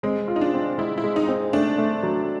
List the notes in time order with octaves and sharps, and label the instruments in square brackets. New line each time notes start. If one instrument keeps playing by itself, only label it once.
[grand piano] G#3 [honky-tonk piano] C4
[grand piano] F4
[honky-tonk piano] D#4
D4
[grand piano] C4
[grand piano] G#3 [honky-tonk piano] E4
[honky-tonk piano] E4
[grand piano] G#3
[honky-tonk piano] D#4
[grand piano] C4
[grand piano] A3 [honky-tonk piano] D4
[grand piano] A3
F#3